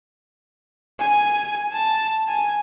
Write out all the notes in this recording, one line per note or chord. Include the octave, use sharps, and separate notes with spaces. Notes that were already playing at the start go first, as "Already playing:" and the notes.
G#5
A5
G#5